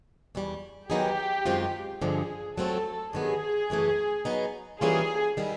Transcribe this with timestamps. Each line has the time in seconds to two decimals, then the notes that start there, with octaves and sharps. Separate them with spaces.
0.35 E2 B2 G3
0.90 D#3 F#3 B3 D#4 G4 G#4
1.46 F#2 D#3 G#3 C4 F4
2.02 G2 D3 F3 G#3 G#4
2.58 F#3 A3 C4 F4 A4
3.13 G2 D#3 F#3 B3 G#4
3.70 F#2 C#3 E3 A3
4.25 F#3 B3 D#4
4.81 E3 G3 A#3 C#4 F4 G#4
5.37 D#3 G3 B3 E4